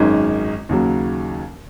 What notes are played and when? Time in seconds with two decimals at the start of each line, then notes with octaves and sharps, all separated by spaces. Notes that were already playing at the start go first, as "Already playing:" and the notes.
Already playing: G#1 F#2 D#3 G#3 C#4
0.69 D#2 C#3 F#3